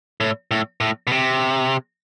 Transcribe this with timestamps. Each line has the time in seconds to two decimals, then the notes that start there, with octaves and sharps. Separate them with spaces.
0.20 A2
0.51 A2
0.80 A2
1.07 B2
1.12 C3